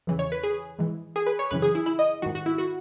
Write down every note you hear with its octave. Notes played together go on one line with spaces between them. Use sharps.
E2 C#3 E3
C#5
B4
G#4
G#2 E3
G#4
B4
C#5
F#2 C#3 E3 B4
G#4
E4
E4
D#5
G#2 D#3 F#4
F#4
E4
F#4